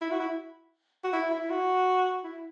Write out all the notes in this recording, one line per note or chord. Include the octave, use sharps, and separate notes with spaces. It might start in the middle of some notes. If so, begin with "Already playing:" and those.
E4
F#4
E4
F#4
E4
E4
F#4
E4